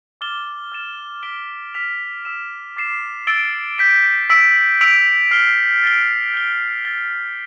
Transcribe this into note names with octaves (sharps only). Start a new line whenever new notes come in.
D6 F6 A6 E7 G7
F6 A6 E7
F6 B6 D7 G7
F6 B6 F7
E6 B6 E7
D6 A6 C7 E7
E6 A6 D7 G7
G6 B6 D7
E6 B6 D7
E6 B6 D7 F7
F6 C7 G7
A6 D7 G7
G6 D7 G7
A6 C7 G7